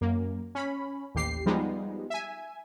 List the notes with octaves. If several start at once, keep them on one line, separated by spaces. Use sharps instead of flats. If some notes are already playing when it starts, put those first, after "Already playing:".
F#2 A#3
C#4 B5
A1 D#2 G4 C7
F3 G3 G#3 B3 D#4
E5 G#5